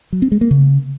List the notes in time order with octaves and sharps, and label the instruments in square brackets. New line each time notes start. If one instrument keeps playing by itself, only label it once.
[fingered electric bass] F#3
C4
G#3
A#3
C#3